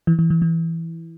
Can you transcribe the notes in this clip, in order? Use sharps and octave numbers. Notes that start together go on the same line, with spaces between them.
E3
E3
E3
E3